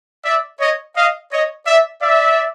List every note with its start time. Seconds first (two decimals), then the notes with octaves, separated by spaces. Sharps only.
0.24 D5 E5
0.60 C#5 D#5
0.96 D#5 F5
1.31 C#5 D#5
1.66 D5 E5
2.01 D5 E5